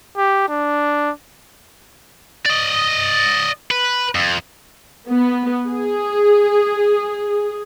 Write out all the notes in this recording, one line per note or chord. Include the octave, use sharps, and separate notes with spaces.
G4
D4
D5 D#5
B4
F2
B3
G#4